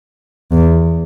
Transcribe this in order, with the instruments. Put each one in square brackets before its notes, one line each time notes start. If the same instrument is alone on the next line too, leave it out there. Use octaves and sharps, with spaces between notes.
[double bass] E2